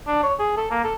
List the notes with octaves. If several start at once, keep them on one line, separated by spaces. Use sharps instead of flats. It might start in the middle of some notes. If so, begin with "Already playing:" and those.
D4
C#5
G#4
A4
A#3
A4